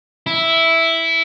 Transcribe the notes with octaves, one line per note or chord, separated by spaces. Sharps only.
E4